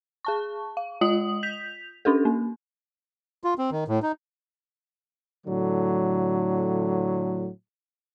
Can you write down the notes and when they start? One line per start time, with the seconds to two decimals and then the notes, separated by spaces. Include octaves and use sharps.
0.25 G#4 A5 C#6
0.77 F5
1.01 G#3 F4 D#5 D#6 F#7
1.43 G6 B6 F7
2.05 C#4 D4 G4 A4
2.25 A#3
3.44 F4
3.58 C4
3.72 D#3
3.88 A2
4.02 D#4
5.45 A2 D3 F#3